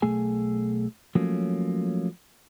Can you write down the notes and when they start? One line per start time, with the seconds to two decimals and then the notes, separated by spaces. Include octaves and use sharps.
0.02 B1 A3 G#4 G#5
1.15 F3 F#3 A3 A#3 C#4